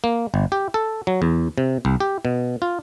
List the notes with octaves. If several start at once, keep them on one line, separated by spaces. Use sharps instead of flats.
A#3
G1
G4
A4
F#3
E2
C3
C2
G4
B2
F4